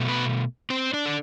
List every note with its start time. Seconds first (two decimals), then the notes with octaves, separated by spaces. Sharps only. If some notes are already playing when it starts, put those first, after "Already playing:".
Already playing: B2 A3
0.08 B3 B4
0.70 C4 C5
0.93 D4 D5
1.05 A4